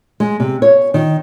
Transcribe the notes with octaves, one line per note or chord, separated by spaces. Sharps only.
G#3
C3
C#5
D#3